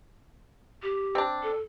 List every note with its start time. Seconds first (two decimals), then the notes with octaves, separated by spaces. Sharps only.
0.83 G4
1.15 C4 D4
1.43 A4